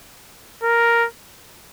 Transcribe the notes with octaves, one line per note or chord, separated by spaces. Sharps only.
A#4